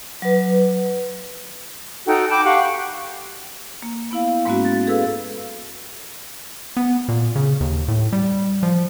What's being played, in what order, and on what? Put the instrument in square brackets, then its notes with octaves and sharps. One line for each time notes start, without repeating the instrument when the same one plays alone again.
[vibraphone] F#3 B4
[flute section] D#4 F#4 A4 G5
G5 A5 B5 D6
G4 F5 F#5 C#6
[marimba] A#3
B3 E4 F5
G#2 G#3 A#3 B3 C#4 F#4
A6
G#4 A4 B4 F5 E6
[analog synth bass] B3
A#2
C#3
D#2
A2
G3
F3